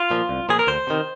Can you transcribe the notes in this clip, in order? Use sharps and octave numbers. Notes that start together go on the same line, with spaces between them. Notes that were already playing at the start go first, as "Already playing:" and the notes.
Already playing: F4
A#2 F3
C2
A#2 F3 G#4
A#4
D2 C5
C3 D#3